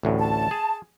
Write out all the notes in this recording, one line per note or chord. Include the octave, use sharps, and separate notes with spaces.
A1 D2 A2
A5
G#4